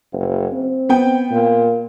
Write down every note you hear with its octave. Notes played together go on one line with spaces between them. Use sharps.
F#1
C4
B3 G5
A#2